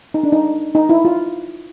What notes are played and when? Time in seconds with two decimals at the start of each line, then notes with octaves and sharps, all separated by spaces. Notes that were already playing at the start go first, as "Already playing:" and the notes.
0.14 D#4
0.23 D4
0.32 D#4
0.75 D#4
0.89 E4
1.05 F4